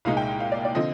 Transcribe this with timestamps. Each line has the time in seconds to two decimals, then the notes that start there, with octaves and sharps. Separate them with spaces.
0.05 C2 A#2 G#3 D#4 F5
0.17 G5
0.40 F5
0.52 D5
0.65 D5
0.75 D3 F3 C4 D#5